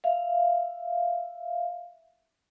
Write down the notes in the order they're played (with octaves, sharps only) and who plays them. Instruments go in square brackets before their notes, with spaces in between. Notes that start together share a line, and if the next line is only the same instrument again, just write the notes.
[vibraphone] E5 F5